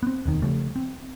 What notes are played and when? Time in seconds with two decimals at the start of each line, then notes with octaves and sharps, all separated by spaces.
0.03 B3 C4
0.26 E1 D#2 D#3
0.42 C#3 F3 G3 A3
0.76 C4